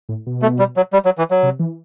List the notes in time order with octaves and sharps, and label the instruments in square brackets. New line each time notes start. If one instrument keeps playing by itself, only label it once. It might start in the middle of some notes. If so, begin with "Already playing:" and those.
[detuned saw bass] A2
B2
[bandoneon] A3
G3
F#3
G3
F#3
E3
F#3
[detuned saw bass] C3
E3